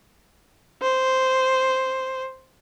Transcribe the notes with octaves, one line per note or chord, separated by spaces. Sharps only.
C5